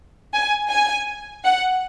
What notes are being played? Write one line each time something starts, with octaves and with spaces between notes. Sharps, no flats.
G#5
G#5
F#5